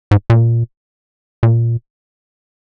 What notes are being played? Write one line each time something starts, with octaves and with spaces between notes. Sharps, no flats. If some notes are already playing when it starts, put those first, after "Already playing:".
G#2
A#2
A#2